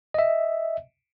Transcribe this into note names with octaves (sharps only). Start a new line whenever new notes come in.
D#5 E5